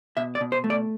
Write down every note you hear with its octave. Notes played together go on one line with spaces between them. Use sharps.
B2 E5
D5
B2
C5
A3
D5